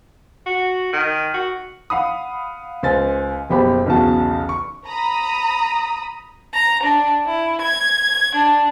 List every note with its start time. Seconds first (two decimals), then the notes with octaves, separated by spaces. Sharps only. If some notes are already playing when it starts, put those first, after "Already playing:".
0.46 F#4
0.93 D#3
1.34 F#4
1.90 F5 F#5 B5 D#6
2.83 C#2 C5 G#5 A6
3.50 F#1 B2 G4 C5 B5
3.86 B1 E2 C#3 F#4 A5
4.49 C#6
4.87 A#5 B5 D#6
6.53 A#5
6.83 D4
7.25 E4
7.61 G#6
8.35 D4